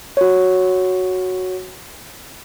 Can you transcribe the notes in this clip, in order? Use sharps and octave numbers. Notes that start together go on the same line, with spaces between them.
F#4 C#5